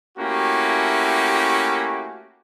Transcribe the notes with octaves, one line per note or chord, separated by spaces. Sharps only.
A3 A#3 C#4 E4 F#4 G4